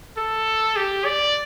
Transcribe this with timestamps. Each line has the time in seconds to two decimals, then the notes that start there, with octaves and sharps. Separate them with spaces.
0.17 A4
0.76 G4
1.05 D5